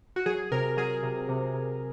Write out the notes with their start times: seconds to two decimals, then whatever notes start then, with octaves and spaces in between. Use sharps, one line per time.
0.16 F#4
0.26 F#3 G#4
0.52 C3 A#4
0.77 F#3 G#4
1.03 C3
1.29 C3
1.54 C3